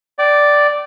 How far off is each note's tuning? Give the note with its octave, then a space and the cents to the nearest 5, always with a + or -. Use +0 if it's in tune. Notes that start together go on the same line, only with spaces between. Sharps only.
D5 +0 G5 -35